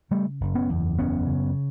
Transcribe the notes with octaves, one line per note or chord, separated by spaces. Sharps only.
C#3 G3 A3
F#1
B3 C#4
E2
F#1 B3 C#4
C#3